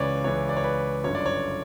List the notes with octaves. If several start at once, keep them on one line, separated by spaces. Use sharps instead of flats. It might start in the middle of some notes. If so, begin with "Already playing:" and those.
Already playing: C#2 C#3 E3 B4 C#5 D5
C#2 C#3 E3 C#5
D5
C#5
B4
G1 F#2 D3 C#5
D5
C#5